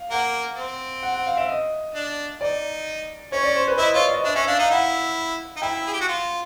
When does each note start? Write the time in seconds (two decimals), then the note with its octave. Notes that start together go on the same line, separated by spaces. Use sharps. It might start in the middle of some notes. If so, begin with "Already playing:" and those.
Already playing: F5
0.10 A#3 F#5
0.56 C4
1.03 F#5
1.14 F#5
1.26 F5
1.37 E5
1.49 D#5
1.95 D4
2.41 D#4 D5
3.32 C#4 C#5
3.44 D5
3.56 C5
3.67 B4
3.78 E4 D#5
3.94 F4 C#5
4.04 D5
4.14 D#5
4.24 D4 E5
4.35 C#4 E5
4.47 D4 F5
4.59 D#4 F5
4.70 E4 F#5
5.57 D#4
5.62 E4 G5
5.87 G#4
5.93 G4
6.01 F#4
6.08 F4